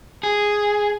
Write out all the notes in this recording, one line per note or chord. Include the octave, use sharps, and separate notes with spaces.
G#4